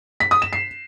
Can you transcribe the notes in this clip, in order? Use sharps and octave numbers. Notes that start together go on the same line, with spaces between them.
B6
D#6
E7
C7